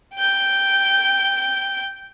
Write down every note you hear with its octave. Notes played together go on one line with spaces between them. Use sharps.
G5 G6